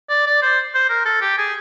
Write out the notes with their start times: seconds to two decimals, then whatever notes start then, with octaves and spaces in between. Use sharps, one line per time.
0.10 D5
0.27 D5
0.42 C5
0.75 C5
0.90 A#4
1.05 A4
1.21 G4
1.38 G#4